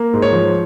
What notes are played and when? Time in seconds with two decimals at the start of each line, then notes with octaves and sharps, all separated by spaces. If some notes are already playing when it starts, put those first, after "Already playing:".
Already playing: A#3
0.13 G#2
0.22 C#5
0.33 F3